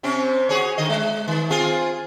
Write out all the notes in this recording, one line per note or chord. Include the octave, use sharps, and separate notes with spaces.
C3 C4 C#4
F#4 G#4 C#5
D3 D#3 D#5
G#3
D#3
C4 F4 G#4